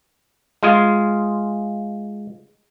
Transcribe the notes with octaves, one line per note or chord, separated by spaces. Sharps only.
G#3 F4 G#4